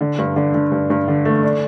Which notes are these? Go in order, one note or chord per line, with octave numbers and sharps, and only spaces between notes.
D3
G2
D3
D3
G2
G2
D3
A3
D4